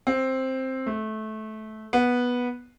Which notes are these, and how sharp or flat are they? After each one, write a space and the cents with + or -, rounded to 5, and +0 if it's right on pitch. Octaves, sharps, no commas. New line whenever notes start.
C4 +5
A3 -20
B3 -10